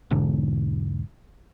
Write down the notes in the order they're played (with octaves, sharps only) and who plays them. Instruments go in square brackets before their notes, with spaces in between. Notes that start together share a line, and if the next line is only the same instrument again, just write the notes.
[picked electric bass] E1 B1 G#2 D3